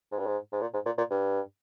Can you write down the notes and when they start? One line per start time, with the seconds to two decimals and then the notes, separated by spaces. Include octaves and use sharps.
0.11 G#2
0.19 G2
0.26 G#2
0.53 G#2
0.61 A#2
0.74 G#2
0.85 A#2
0.98 A#2
1.10 G2